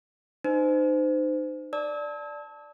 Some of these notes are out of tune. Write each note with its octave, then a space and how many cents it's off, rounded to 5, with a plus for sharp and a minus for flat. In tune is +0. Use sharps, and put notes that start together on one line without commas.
D#4 -30 C5 -30
D5 +0 A5 +0 E6 -40